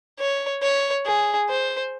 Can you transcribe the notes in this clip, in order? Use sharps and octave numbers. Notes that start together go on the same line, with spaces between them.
C#5
C#5
G#4
C5